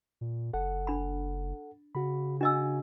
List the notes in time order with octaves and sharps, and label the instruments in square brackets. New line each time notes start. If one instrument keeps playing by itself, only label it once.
[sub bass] A#2
[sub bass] F#1 [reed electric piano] A4 F#5
[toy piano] D4 B5
[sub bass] C#3 [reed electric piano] F#4 B5
[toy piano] D4 D#5 E6 [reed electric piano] F#4 G#5